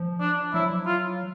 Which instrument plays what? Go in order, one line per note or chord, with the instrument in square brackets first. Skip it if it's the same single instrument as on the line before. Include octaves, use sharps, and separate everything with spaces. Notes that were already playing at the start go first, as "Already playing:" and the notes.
Already playing: [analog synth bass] F3
[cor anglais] D4
[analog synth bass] F#3 [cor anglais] E4
[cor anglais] F4